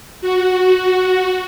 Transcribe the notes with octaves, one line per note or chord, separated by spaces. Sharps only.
F#4